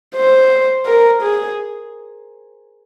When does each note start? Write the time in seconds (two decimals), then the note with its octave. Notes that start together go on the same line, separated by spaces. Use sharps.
0.16 C5
0.86 A#4
1.22 G#4